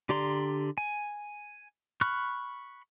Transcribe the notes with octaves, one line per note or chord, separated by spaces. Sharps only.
D3 G4 D5 A#5 C6
G#5
B5 C#6 F6 F#6